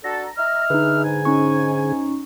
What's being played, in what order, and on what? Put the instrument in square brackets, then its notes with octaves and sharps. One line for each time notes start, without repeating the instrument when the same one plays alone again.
[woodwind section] D4 F#4 A4 [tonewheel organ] A#5
[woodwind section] D#5 E5 F6
[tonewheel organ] D3 G#4 [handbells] D#4 B4
[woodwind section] G#2 G#5
[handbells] C#4 D#4 C#6